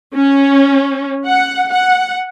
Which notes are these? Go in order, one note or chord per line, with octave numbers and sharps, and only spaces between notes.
C#4
F#5
F#5